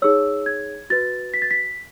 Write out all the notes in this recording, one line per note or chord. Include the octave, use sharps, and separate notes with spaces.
D#4 G#4 C#5 E6
G#6
F#4 B4 A6
B6
A6
B6